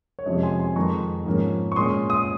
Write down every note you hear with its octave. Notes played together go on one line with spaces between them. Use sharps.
C#5
F2 C3 F3 G#3 C#4 D#5
G#5 C6
G#5 C6
F2 D#3 G#3 A#5 C#6
G#2 F3 A#3 C#4
C#6
A#2 G#3 C#4 C6 D#6
C6 D#6